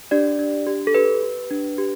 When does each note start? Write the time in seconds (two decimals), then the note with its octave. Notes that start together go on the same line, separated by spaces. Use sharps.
0.11 D4 G4 D5
0.39 D4
0.67 G4
0.87 A4
0.95 G4 B4
1.23 G4
1.51 D4
1.78 G4